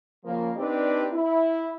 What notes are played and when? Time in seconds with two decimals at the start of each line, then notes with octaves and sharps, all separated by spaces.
0.25 C#3 F3 A#3
0.57 C4 D4 D#4 G4 B4 D5
1.11 E4